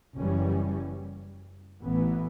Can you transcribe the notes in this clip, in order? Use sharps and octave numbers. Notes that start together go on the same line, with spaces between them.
F#1 F#2 E3 G3 C#4
A1 A2 E3 B3